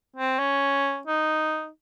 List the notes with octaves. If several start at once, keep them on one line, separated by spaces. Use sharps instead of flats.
C4
C#4
D#4